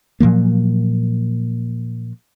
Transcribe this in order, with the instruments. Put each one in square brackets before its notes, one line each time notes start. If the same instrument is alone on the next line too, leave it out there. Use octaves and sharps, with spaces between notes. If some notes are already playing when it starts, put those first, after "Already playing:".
[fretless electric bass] A#2 F3 F#3 A#3